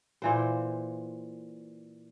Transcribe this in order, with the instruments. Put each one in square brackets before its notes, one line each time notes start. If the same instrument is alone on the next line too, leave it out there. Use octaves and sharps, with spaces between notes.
[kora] A#2 E3 C5